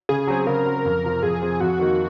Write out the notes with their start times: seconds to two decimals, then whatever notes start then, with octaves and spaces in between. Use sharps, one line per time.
0.09 C#3 G#4
0.27 F#3 C4
0.47 C#3 A#4
0.66 F#3 C4
0.85 F2
1.04 C3 F3 C4
1.22 F2 G#4
1.41 C3 F3 C4
1.60 F2 F#4
1.79 D#3 A#3 D#4